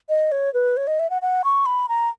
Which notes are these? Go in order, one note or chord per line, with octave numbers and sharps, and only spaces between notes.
D#5
C#5
B4
C#5
D#5
E5
F#5
F#5
C#6
B5
A#5